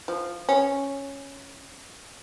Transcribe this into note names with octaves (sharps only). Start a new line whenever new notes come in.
F3
C#4